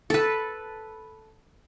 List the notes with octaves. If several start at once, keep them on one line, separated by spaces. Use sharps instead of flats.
A4 B4